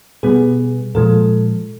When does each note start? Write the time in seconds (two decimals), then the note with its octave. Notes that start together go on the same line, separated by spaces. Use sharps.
0.23 B2 G3 B3 G#4
0.95 A#2 F3 G#3 A4